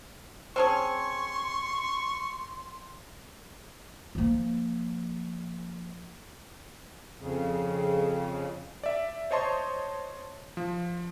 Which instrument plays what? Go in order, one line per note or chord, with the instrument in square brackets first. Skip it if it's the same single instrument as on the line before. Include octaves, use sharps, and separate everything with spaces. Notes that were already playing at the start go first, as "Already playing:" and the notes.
[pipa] C4 C#4 G#4 [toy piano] C5 A5 [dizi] C6 [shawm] C#6
[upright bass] F3 A#3
[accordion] F2 C#3
[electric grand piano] D5 E5
C5 C#5 D#5 A5 C6 C#6
F3